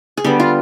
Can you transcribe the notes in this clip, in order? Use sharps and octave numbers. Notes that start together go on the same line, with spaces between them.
G#4
D3 G3 B3 G4
F4